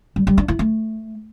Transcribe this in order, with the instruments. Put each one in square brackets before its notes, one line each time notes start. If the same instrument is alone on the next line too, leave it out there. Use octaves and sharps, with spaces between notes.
[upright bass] G3
G3
D4
E4
A3